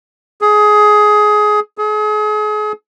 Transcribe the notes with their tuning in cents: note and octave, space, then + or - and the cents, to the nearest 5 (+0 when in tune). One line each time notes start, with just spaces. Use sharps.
G#4 +15
G#4 +35